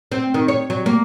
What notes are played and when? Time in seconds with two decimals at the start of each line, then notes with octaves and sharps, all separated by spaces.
0.12 C4
0.34 D#3
0.48 C#5
0.70 F#3
0.86 A#3